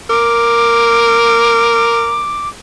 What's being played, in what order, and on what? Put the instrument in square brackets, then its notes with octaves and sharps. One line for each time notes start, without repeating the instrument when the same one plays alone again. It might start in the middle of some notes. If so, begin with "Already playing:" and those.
[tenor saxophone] A#4 [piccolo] D6